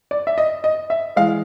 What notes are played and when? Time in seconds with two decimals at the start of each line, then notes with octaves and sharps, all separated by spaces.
0.11 D5
0.27 E5
0.38 D#5
0.64 D#5
0.90 E5
1.16 E3 G#3 F5